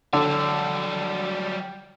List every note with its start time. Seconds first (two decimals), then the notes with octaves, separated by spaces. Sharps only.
0.13 D3 F#3 G3